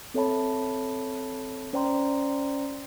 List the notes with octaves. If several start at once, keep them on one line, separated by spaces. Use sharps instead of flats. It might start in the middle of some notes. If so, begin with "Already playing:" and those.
C4 A4 C#5 E5 A5 B5
C#4 C5 D5 G5 A#5 C6